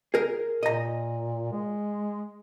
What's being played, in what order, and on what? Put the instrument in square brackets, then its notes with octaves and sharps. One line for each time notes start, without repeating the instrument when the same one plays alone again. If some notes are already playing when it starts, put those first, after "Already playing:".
[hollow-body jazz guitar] G#4 A#4
[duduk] A#2 [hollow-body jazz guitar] D#5 A#5
[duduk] G#3